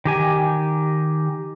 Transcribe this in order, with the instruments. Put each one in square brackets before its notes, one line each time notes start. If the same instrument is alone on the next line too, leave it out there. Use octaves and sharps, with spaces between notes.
[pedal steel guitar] D#3 G4 G#5